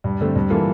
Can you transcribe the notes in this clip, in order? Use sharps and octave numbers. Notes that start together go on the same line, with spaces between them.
G2
D3 A3 C4
G2
E3 A#3 F4 A4